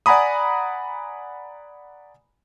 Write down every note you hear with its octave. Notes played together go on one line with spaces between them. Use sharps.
D5 F#5 G#5 A#5 B5 D#6